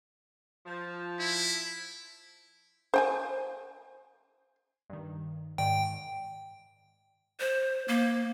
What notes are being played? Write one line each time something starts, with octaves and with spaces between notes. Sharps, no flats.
F3
E4
C5 G5 G#5
G2 D#3
G#2 D#3 D5 G5
C5
A#3